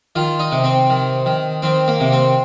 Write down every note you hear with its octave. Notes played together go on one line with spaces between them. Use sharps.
D#3 F4
D#4
C3
C4
D#3
D#3
D#3 C4
A#3
C3
C4